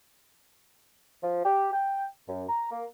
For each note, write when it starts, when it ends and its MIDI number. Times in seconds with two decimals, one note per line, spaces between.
1.23 1.41 53
1.45 1.71 67
1.73 2.06 79
2.29 2.44 42
2.49 2.69 82
2.71 2.84 58